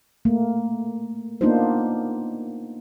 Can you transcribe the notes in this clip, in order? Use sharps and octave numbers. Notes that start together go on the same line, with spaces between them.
A3 A#3
A#3 B3 D4 D#4 F4 C5